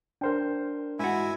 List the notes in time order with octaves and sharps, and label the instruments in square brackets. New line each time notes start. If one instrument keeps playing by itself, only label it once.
[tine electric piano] D4 A#4 [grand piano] C5 G5
[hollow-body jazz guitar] G#2 F#4 [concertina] E4 E5 G#5